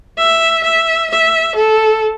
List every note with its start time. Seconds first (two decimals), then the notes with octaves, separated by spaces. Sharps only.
0.18 E5
0.64 E5
1.10 E5
1.55 A4